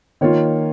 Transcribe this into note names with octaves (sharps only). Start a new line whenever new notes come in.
D#3 A#3 F4 C#5